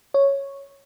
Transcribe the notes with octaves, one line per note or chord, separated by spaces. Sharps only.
C#5